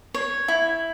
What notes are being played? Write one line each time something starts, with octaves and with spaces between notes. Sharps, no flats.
C#5
E4